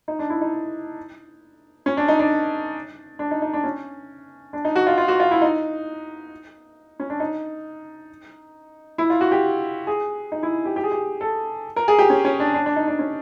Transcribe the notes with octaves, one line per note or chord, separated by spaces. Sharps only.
D#4
D4
E4
D#4
C#4
D4
D#4
D4
D4
D#4
D#4
D4
C#4
D4
D#4
F#4
F4
F4
F#4
F4
E4
D#4
C#4
D4
D#4
E4
F4
F#4
G4
G#4
D#4
E4
G4
G4
G#4
G4
A4
A#4
G#4
G4
C#4
C#4
D4
D4
D4
D#4
D4
C#4